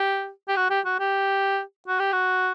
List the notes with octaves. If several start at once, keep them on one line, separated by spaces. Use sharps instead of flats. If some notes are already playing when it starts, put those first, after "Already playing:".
Already playing: G4
G4
F#4
G4
F#4
G4
F#4
G4
F#4